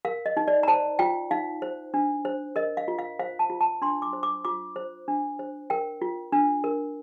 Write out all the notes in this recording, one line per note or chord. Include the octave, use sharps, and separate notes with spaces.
A#4 F5
D#5
D#4
D5
A#5
C5 A5
F4 G5
D#4 F5
C5
D4
C5
A#4 D#5
F5
F4
F5
C5 F5
A5
F4
A5
D4 C6
D6
C5
D6
F4 D6
C5
D4
C5
A#4 G5
F4
D4
A#4